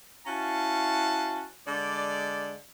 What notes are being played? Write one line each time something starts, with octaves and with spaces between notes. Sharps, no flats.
C#4 E4 F#4 F5 A5
D3 G#3 D5